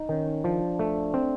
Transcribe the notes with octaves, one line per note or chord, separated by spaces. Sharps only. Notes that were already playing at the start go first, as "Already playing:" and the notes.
Already playing: D#4
D#3 C#4
F3 D4
A3
C4